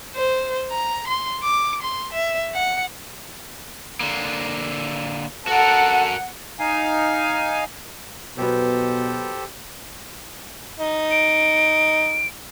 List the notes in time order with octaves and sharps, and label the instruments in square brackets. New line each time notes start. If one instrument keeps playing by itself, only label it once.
[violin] C5
A#5
C6
D6
C6
E5
F#5
[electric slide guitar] D3 A#3
[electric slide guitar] F#4 A#4 [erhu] A4 [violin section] F#5
[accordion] D#4 F5 G#5
[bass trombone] B2 [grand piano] F#3 B3 [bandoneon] G4 A4 C5
[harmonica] D#4
[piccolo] D7